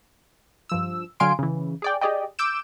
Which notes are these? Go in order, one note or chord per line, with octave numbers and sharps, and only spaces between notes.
G2 F3 E6
D3 F#3 F5 G#5 C6 D7
C#3 E3
G#4 D5 G5
G4 G#4 D5 D#5 G5
D6 E6 G6 D7 E7